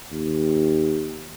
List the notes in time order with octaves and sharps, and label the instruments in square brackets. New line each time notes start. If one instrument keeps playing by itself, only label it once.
[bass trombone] D#2